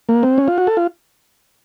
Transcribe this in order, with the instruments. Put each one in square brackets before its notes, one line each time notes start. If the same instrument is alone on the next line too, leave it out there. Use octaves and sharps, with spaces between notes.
[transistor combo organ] A#3
C4
C#4
F4
F#4
A4
F4